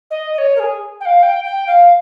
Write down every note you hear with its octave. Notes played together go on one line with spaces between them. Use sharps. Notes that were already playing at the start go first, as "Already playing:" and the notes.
D#5
D#5
C#5
A#4
G#4
G5
F5
G5
G5
F5